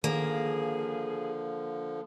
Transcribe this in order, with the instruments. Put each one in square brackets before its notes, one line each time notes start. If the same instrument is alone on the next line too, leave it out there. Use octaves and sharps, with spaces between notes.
[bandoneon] D3 F3 [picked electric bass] D#3 [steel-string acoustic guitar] A#3 [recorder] G#4